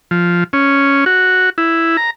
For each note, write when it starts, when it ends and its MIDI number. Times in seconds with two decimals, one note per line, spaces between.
0.11 0.44 53
0.53 1.05 61
1.06 1.50 66
1.58 1.97 64
1.97 2.10 82